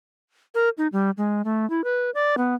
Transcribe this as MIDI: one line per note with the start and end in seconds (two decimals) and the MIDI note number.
0.55 0.69 70
0.78 0.87 63
0.92 1.11 55
1.17 1.42 56
1.45 1.68 57
1.70 1.84 64
1.84 2.10 71
2.14 2.35 74
2.38 2.55 59